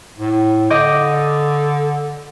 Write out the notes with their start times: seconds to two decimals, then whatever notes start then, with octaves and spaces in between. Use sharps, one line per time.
0.18 A2
0.70 D3 D#5 D6 G6